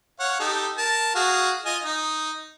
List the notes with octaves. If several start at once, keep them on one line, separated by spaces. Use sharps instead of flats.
C#5 F5 F#5
D#4 G4 A4
A#4 A5
F#4 G#4 F5
F4 D#5 G#5
D#4